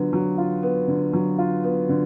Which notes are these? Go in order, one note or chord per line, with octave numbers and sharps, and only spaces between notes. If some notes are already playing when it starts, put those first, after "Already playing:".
Already playing: D3 F#3 B3 F4
F#3
F4
B3
D3
F#3
F4
B3
D3